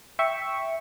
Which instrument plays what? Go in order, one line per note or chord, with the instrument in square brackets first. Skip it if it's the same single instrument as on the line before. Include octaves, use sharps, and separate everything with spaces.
[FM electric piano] E5 G5 C#6